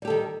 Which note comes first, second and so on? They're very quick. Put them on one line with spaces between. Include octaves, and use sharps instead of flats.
G3 G4 A4 D#3